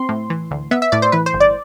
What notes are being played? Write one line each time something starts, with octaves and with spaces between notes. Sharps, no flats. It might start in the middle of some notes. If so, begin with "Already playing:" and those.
Already playing: C4 C6
A2
E3
D2
B3 E5
E5
A2 D5
C5
E3 B4
C5
G1
D5